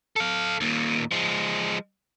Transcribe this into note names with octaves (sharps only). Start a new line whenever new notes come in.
A4 F5
D#2 A#2
F3 G#3